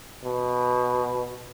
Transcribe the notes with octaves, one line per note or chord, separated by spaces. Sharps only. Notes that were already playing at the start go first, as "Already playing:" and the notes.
B2